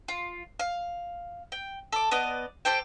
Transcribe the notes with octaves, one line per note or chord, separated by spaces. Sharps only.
F4
F5
G5
A4 D6
B3 D5 D#5
G4 A4 C5 G5